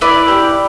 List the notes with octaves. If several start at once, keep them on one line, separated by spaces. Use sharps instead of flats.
E4 B4 D5
G4